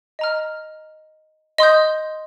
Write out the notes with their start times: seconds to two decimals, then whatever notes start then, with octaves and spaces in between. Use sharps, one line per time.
0.19 D#5 A#5 F6
1.58 D#5 C6 D#6 G6